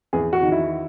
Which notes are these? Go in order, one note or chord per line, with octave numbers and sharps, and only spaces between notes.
E2 G#4
F#4
D#3
E4